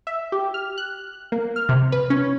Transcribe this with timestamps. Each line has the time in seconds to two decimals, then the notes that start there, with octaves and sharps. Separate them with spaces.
0.07 E5
0.32 G4
0.54 F6
0.78 F#6
1.32 A#3
1.56 F6
1.69 C3
1.92 B4
2.10 C#4